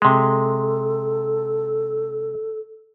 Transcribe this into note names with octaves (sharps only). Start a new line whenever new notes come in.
C3 G#3 A4